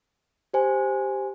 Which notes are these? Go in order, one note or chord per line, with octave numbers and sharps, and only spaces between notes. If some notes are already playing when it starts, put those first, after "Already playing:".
G4 C5 G#5